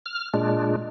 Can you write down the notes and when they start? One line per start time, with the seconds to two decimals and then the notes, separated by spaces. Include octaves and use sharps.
0.06 F6
0.34 A#2 G#3 D4